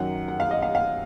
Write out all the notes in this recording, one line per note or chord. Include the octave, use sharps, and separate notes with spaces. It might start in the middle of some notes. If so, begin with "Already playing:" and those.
Already playing: F#2 D#3 F#3 F#5
F#5
F5
D#5
F5
F5